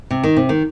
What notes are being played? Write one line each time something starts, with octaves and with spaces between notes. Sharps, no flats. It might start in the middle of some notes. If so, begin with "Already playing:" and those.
C3
D#3
C3
D#3